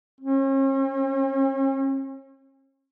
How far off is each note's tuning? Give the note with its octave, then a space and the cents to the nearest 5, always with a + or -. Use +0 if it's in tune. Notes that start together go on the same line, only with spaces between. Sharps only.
C#4 -45